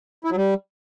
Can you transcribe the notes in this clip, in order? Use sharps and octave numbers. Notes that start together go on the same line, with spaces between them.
E4
F#3
G3